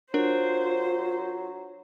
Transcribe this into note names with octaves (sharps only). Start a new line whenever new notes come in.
F#3 D4 F4 A#4 C5